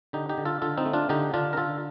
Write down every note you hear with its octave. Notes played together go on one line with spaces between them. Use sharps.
D3 D#4 G4
D#4 G4
D3
F4 A4
D3 F4 A4
C4 D#4
A3
D4 F4
D3 D#4 G4
D3 D4 F4
A#4
D3 F4 A4